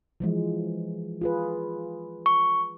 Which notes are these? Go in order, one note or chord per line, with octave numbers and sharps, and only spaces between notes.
E3 F3 G#3
F4 G#4 B4
C#6